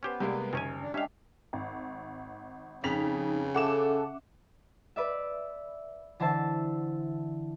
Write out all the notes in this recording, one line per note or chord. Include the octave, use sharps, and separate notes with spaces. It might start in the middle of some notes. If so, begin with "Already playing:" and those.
B3 C#4 G4 C5
C3 G3 G#3 A#3 G4 B4
F#1 D#3 C#4 G#5
D4
G#3 C#4 D4 G4 E5 F5
G#1
F2 C#3 D#4 B6 F7
C#4 A4 E5 F#5 D6 E7
B4 D5 E5
D3 E3 C5 E5 A5 A6